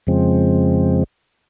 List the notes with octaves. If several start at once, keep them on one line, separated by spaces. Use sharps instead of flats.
F2 C#3 F3 G#3 C4